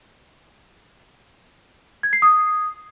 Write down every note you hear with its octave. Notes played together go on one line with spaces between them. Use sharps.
G#6
C7
D#6